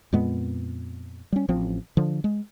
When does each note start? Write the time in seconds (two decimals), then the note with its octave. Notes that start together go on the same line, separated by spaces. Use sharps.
0.13 F2 A#2 G#3 B3
1.32 G3 C#4
1.49 A1 F3 C4
1.97 D3 F3
2.24 G#3